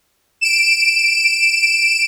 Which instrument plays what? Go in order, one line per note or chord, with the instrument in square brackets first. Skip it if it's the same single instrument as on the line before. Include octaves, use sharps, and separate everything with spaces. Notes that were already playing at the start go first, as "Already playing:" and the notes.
[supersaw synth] D7 E7